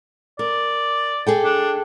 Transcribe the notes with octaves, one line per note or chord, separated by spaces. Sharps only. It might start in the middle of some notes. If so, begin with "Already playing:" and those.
A#4 D5
G#4 A4 G5
D4